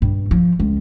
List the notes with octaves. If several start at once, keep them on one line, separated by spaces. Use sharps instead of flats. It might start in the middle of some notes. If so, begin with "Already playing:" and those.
G2
F3
C#2